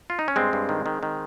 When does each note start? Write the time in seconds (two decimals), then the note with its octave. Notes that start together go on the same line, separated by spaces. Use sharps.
0.10 F4
0.19 D#4
0.28 C#4
0.36 G2 G#3 C4
0.53 G2
0.69 D#3
0.86 D#3
1.03 D#3